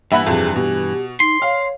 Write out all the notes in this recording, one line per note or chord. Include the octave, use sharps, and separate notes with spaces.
G2 E3 A#3 E5 F#5 B5
F2 C3 G#4
B2 G4
D#4 C6
C#5 F5